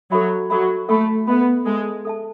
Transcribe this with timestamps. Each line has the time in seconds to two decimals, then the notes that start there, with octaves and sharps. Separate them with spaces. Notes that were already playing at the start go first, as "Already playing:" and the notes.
0.11 F#3 A4 E5 B5
0.50 F#3 A4 E5 B5
0.88 A3 A4 E5 B5
1.27 B3 A4 E5 B5
1.66 G#3 A4 E5 A5
2.05 A4 E5 A5